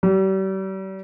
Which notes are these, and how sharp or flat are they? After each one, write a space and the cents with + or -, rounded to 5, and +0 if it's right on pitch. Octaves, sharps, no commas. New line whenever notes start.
G3 -40